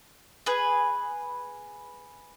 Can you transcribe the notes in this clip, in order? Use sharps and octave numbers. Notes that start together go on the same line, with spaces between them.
G#4 B4